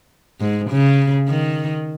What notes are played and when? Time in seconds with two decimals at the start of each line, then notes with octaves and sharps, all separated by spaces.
0.41 G#2
0.70 C#3
1.29 D#3